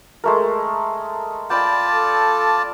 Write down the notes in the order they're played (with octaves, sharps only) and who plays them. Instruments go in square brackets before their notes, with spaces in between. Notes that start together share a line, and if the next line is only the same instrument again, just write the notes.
[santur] G#3 A3 A#4
[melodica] F4 D5 A5 [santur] G5 B5
[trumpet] A4